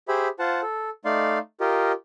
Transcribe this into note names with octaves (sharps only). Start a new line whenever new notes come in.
G4 G#4 C5 E5 B5
F4 C5 F#5 A5
A4
A3 D#4 D5 F5 C6
F4 G4 A#4 D#5